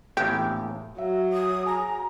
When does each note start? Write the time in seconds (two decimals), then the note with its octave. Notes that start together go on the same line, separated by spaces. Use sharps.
0.17 A#1 E2 A2 G4
0.98 F#3 E5
1.33 D#6
1.66 G#4 A#5